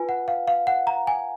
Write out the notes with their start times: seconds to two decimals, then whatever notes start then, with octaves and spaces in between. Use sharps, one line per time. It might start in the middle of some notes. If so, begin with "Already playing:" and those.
Already playing: F4 B4 G#5
0.09 F#5
0.28 F5
0.48 F5
0.67 F#5
0.87 A#5
1.07 G#5